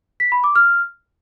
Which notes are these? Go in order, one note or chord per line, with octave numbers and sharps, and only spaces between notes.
B6
B5
D6
F6